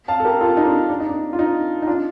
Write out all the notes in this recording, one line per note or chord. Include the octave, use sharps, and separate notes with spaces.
F5 A5
A4
G4 A#4
F4 A4
D#4
D4 F4
D4
D#4
D4
F4
D#4
D#4
D4 F4